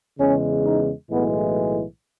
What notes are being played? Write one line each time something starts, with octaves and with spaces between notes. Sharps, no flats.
E2 C#3 G#3 C#4
D#4
B1 A2 E3 G#3 B3